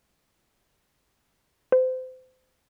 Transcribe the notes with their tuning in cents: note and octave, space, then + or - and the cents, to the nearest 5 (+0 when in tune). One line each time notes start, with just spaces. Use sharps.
C5 -30